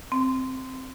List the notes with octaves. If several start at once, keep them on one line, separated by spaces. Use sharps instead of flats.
C4